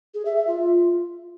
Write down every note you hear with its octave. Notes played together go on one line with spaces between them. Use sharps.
G#4
E5
E5
F4